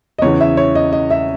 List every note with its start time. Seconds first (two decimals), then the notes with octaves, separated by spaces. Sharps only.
0.18 D#5
0.22 E2 C#3 E3 C#5
0.40 E5
0.57 C#5
0.75 D#5
0.93 D#5
1.10 E5